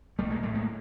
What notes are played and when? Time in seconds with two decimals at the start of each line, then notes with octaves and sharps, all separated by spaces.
0.18 B1 G3 A3
0.30 G#3 A#3
0.43 A2 G3 A3
0.54 G#3 A#3